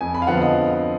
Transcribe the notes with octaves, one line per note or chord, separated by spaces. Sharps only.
F2 G#5
B5
F5
D3 F3 B3 F#5
D#5